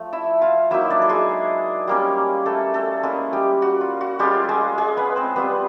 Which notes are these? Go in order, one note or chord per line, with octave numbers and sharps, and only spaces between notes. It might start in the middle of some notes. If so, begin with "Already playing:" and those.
Already playing: F3 A3
E4 E5
F4 F5
F#3 A#3 D#4 E4 E5
D4 D5
A4
G#3 G#4
G3 A#3 C#4
A3 A4
A3 A4
G#3 A#3 C#4 E4 G#4
G3 G4
F#4
F4
F#4
G3 G#3 C#4 F4 G4
G#3 G#4
G#3 G#4
B3 B4
C4 C5
G3 B3 C4 F4 B4